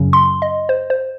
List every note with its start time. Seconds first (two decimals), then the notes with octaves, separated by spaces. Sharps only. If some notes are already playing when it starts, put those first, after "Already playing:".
Already playing: F#2 C#3 F#3 C#4
0.13 C6
0.42 D#5
0.69 C5
0.90 C5